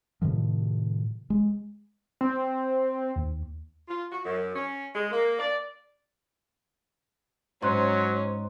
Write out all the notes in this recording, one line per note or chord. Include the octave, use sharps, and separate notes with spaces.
A2 C3 D#3 F3
G#3
C4
D#2
F4
F#4
F#2
C#4
G#3
A#3
D5
G#2 F#3 C#4 C5 C6 F#6